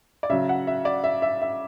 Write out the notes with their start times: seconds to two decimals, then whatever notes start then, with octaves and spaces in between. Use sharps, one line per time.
0.23 D5
0.30 C#3 F#3 E5
0.49 F#5
0.67 E5
0.85 D5
1.04 E5
1.22 E5
1.42 E5